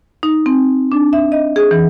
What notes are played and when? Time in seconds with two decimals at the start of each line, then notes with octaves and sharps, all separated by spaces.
0.23 D#4
0.46 C4
0.92 D4
1.13 E5
1.32 D#5
1.56 G#4
1.71 E3